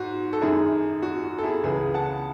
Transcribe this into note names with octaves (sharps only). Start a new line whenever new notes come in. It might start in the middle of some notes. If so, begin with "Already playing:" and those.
Already playing: G#2 F#4
A4
F#2 D#3 E4 G#4
F#4
F#4
A4
E4 G#4
C#2 C#3 E3 G#4 B4
F#5 A5